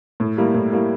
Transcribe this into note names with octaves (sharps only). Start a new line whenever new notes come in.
A2
G3 A#3 E4
A2
G3 A#3 E4